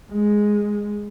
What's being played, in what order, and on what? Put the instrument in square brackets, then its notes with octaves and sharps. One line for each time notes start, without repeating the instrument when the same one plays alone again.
[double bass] G#3